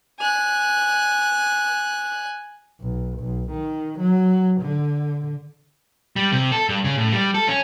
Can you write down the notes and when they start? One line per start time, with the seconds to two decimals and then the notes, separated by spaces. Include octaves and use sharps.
0.20 G#5 F#6
2.81 B1
3.20 B1
3.51 D#3
4.00 F#3
4.62 D3
6.16 G3
6.32 C3
6.52 A4
6.69 G2
6.84 C#3
6.98 A2
7.13 G3
7.34 A4
7.48 C#4